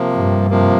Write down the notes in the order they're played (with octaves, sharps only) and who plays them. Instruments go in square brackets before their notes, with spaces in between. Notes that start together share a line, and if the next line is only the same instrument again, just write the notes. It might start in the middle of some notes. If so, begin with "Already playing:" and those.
Already playing: [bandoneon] C3 F3 A#3
[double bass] G2
[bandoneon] C3 F3 A#3